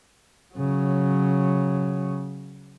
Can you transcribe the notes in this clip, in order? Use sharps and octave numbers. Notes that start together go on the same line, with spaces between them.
C#3 F#3